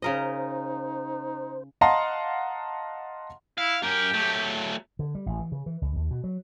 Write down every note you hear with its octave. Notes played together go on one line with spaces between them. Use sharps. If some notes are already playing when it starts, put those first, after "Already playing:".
C#3 D#4 A#4 C5 D#5
D#5 F5 F#5 A5 A#5 C6
E4 F5
F#2 G4 A#4
F#3 A3
D3
G3
A1
E3
C#3
E3
C#2
D#2
B2
F#3